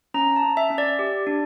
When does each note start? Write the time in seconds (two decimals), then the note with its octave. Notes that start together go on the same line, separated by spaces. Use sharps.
0.14 C#4 A#5
0.36 A5
0.43 C#4
0.57 E5
0.70 C#4
0.78 D5
0.99 G4
1.27 D4